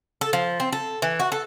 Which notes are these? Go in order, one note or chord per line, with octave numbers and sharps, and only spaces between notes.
A4
F3
C4
A4
E3
F#4
A4